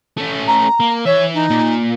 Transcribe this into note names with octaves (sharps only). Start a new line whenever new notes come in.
A3 C#4
A#5
A#3
E3 C#5 E5
D#4
A#2